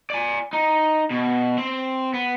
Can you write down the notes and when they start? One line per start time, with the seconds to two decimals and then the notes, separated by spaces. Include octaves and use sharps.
0.10 D5 G#5
0.53 D#4
1.10 B2
1.58 C4
2.14 B3